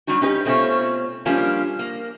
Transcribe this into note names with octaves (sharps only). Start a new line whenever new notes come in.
F#3 G3 D4 D#4 F#4
C#4 D#4 G4 B4
B2 A3 C4 C#4 F4 C#5
F3 G3 A#3 C#4 D4 F4
A#3